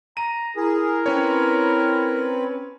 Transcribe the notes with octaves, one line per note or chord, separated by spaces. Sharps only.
A#5 D#7
E4 G#4 A#4
C4 C#4 B4 C#5